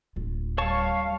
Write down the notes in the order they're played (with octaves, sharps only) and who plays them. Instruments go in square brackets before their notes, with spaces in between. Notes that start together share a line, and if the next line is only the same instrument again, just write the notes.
[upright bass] D1 F4
[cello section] G3 F5 [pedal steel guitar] C#5 A5 C#6